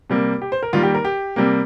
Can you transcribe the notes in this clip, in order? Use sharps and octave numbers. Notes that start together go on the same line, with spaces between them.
C3 G3 A#3
G4
C5
A#4
D#3 G3 A#3 F4
G4
A#4
G4
C3 G3 A#3